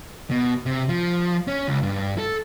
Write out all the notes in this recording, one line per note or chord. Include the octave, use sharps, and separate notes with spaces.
B2
C3
F3
C#4
C#2
G2
A4